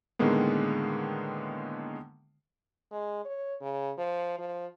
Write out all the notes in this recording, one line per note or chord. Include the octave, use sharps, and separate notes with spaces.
A2 D3 D#3 G#3 A#3 B3
G#3
C#5
C#3
F3
F3